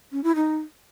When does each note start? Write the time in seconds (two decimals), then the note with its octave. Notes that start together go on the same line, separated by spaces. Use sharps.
0.12 C#4
0.24 E4
0.35 D#4